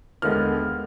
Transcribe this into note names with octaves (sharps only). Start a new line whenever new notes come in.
D#2 D3 G#3 B3 F6